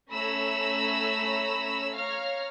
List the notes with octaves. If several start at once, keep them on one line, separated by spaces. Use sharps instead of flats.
A3 C#4 C#5 A#5 B5 E6
C#5 F5 A#5 F6